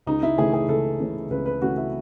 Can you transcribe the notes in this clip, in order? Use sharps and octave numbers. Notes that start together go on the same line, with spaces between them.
C#2 D#4
E4
C#3 E3 A3 C#4 G#4
G#4
C#2 A4
C#3 E3 A3 C#4
C#2 B4
B4
C#3 E3 A3 C#4 F#4
E4